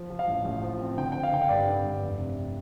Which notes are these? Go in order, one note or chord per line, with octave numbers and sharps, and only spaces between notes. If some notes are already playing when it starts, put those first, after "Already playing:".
Already playing: F3
F3
F5
A1
A1
F3
C4
D3 G5
C4 G5
F5
D3 G5
F5
G2 D5
D3
G2
F1
C3